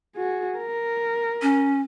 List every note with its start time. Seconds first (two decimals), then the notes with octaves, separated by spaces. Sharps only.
0.16 F#4 G#4
0.58 A#4
1.42 C#4